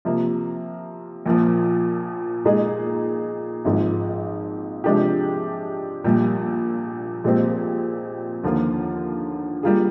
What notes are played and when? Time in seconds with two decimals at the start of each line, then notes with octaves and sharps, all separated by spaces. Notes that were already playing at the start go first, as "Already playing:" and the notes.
0.05 C3 F3 A#3
1.26 A#1 A#2 F3
2.44 A#2 G#3 D#4 G#4
3.65 G#1 G#2 F3 G#3
4.84 C3 F3 G#3 D4 G4
6.04 A#1 A#2 G3
7.24 A#1 A#2 G#3 C4 G4
8.43 D#2 D3 F3 A#3 F4
9.63 G3 A#3 F4 G#4